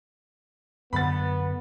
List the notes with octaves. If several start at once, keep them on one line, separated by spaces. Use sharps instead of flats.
F#2 D3 B3 B5 A6